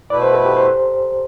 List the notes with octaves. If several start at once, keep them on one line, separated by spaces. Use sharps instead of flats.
B2 A3 E4 B4 D5
C5
A4
G4
C5